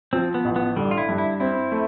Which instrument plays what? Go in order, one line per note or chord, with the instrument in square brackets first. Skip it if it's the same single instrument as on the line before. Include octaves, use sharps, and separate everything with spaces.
[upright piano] F3 [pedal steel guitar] C4
[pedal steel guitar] B3
[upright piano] A1
[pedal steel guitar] B3
[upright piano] D3 [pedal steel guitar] G3
[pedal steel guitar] F4
E4
[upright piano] G2
[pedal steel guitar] E4
[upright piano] C4 [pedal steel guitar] E4
[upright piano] A3